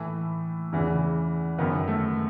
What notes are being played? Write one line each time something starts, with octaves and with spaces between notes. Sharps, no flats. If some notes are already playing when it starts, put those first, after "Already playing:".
Already playing: A2 E3 A3
E2 C#3 E3
F#2 D#3 B3
A3